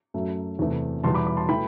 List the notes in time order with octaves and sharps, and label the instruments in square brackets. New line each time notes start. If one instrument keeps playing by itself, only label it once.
[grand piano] F#2 F#3 A3
E2 C3 E3 A3
E2 B2 G3 A5 C6
B5 D6
B5 D6
A5 C6
E3 A3 G5 B5